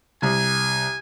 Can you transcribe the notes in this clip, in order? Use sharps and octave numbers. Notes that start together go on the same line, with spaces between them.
C2 G#5